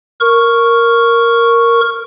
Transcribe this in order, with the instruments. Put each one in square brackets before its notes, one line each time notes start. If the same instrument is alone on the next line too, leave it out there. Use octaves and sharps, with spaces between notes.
[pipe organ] A#4 C#6